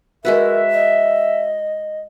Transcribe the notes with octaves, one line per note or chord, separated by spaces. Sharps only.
G#3 F#4 A#4 B4 E5
D#5